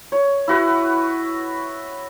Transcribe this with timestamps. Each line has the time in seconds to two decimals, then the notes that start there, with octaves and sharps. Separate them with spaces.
0.12 C#5
0.48 E4 F#4 B4